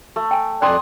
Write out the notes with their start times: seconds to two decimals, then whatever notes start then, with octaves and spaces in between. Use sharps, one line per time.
0.16 A3
0.31 G5 G#5
0.62 F2 D5 G5 G#5 C6 D#6 F#6